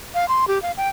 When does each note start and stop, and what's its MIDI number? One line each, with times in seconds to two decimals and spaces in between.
0.15 0.28 77
0.28 0.47 84
0.48 0.61 67
0.62 0.71 77
0.77 0.89 79